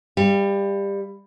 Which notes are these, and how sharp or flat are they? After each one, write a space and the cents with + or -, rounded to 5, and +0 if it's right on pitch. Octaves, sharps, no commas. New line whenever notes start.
G3 +20 F5 -30